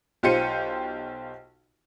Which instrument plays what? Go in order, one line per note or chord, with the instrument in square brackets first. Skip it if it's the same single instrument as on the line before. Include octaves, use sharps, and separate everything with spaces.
[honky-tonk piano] B1 F4 G4 C5 C#7 D#7